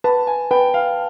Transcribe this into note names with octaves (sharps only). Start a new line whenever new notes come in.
B4 A5
G#5
B4 G5
F5